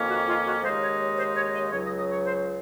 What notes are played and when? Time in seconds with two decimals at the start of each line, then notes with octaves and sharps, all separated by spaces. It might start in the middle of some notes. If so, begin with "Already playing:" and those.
Already playing: F2 D#3 A#3 C#4
0.09 F#4
0.27 F4
0.45 F#4
0.64 D#2 C#3 G#3 D#4 C5
0.82 C#5
1.18 C5
1.36 C#5
1.54 D#5
1.72 C#2 C#3 F#3 C#5
1.85 D#5
1.98 D#5
2.12 C#5
2.25 C5